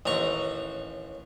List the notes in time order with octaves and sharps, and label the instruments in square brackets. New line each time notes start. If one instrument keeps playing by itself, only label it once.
[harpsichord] A1 D#2 A#5 C#6